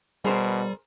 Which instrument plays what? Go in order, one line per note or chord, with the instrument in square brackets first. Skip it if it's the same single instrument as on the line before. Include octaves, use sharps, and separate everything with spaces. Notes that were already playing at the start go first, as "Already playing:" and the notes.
[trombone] B2 [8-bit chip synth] G3 [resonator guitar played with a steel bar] G#4 A#4 C5